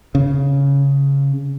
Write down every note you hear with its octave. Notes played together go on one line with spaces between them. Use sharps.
C#3